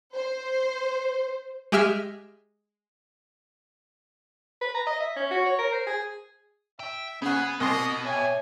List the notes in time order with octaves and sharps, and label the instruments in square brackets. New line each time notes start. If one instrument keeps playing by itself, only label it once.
[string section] C5
[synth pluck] G#3 G4 E5 F6
[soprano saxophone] B4
A#5
D#5
E5
C#4
F#4
C#5
A#4
C5
G#4
[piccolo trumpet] E5 [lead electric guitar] G5
[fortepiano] C#3 F#5 [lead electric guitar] B3 [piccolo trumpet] G#4
[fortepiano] C2 C6 [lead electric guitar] B2 [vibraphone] C4 [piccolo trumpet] D#5
[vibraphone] C#5 E5 G5 [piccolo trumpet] G#5